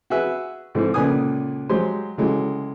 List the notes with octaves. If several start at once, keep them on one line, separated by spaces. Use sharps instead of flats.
F#4 G#4 B4 E5
G#2 D3 E3 C4
C#2 A#2 D3 B4 G#5 D#6
F#3 G#3 G4 C5 C6
C#2 D3 E3 F#3 G#3